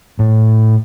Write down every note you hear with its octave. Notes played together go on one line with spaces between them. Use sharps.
A2